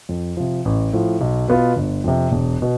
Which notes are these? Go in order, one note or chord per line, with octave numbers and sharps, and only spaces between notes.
F2
C3 F3
A1
A2 F3
B1
B2 B3 F4
G1
F2 C3
E1
B2